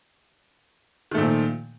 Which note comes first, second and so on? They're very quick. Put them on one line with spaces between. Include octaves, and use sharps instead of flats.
D#3 A3 A#2 F3